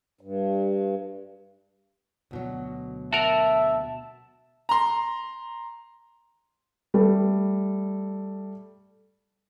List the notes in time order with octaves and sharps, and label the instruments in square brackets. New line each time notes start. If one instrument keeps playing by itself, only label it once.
[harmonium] G2
[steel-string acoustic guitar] D2 B2 F#3
[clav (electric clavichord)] F#4 A#4 [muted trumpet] E5 [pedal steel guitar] A5
[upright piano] A#5 C6
[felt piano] G3 A3